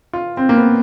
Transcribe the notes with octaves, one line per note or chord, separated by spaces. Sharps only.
F4
C4
A#3
B3